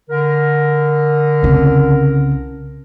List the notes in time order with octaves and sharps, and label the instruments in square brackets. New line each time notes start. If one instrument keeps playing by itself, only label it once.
[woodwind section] D3 A#4
[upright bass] C2 C#3